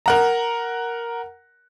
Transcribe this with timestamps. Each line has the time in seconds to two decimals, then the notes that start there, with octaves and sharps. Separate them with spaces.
0.06 A#4 F#5 A#5